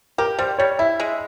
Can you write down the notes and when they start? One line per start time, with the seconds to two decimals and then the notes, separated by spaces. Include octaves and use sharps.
0.18 G4 A#4
0.39 G3 C5
0.59 G3 C#5
0.79 E4 E5
1.00 G#3